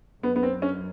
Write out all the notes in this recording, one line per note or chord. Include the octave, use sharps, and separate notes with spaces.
F#2 B3
B3
C4
C#4